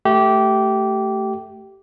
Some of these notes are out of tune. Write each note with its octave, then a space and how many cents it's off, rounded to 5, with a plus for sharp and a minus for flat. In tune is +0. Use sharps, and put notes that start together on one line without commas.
A3 +0 G4 -20